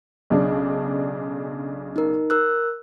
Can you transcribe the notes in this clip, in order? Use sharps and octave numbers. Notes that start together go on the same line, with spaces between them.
B1 C#3 D4
D#4 A#4
A#4 E6 F#6